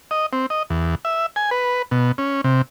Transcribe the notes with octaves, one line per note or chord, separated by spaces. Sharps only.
D#5
C4
D#5
E2
E5
G#5
B4
B2
C#4
C3